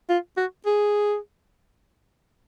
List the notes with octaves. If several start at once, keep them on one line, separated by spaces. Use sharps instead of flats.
F4
F#4
G#4